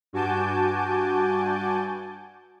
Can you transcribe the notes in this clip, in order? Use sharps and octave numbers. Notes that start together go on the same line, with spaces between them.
G2 F#4 G#5 A5 D6 G6